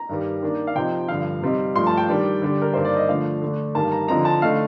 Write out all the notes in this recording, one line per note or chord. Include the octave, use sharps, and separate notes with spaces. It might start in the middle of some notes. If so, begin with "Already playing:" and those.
Already playing: A#5
G2 D#3 G3
D#3 A#3 D4
F5
C3 F3 C4 D#4 G5
G2 D3 F3 F5
C3 G3 C4 D#4
G2 F3 A3 C6
A5
G5
D#3 G3 D4
D3 G3 D4
A#4
G2 D#3 A#3 D4 C5
D5
D#5
D3 F3 A3 D4 F5
D3 A3 D4
G2 D#3 G3 A#3 A5
A#5
D3 F3 C4 D#4 A#5
A5
D3 A3 D#4 F5